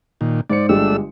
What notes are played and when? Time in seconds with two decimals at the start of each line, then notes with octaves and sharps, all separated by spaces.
0.21 A#2 D#3
0.50 G#2 C5 D5 C#7
0.69 G1 G#3 A3 D4 G4 E6